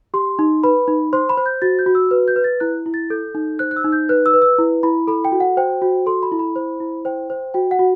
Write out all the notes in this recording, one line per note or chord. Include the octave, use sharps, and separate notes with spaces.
G4 C6
D#4
B4 B5
D#4
C5 C6
B5
C5
G6
F#4 A6
G6
F#4
E6
B4
G6
B4
A6
E4 F#6
E4
A6
A4 G6
D#4
C5 F#6
F#6
E6
D#4
G6
B4 F#6
E6
B4
E6
E4
E4 B5
A4 B5
G5
F#4
F#5
C5 G5
F#4
A4 C6
B5
E4
B5
C5
E4
C5 G5
C5
F#4 G5
F#5
F#4